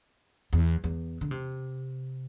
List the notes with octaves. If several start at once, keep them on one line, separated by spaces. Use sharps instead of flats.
E2
E2
D3
C3